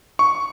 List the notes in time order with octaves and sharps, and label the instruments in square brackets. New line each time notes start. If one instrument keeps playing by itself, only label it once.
[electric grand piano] C#6